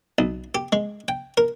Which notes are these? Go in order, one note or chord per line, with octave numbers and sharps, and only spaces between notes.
B1
G4
G#3
G5
A#4